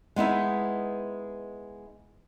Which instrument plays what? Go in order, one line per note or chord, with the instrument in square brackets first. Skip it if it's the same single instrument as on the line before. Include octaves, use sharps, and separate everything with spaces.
[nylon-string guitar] G#3 B3 D#4 E4